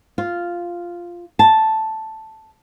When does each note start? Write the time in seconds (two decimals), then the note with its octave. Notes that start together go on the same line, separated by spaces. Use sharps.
0.18 F4
1.39 A5